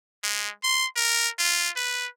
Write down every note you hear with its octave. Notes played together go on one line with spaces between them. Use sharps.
G#3
C6
A#4
F4
B4